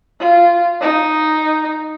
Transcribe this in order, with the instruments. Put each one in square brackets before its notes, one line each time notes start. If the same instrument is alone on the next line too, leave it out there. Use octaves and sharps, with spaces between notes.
[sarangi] F4
D#4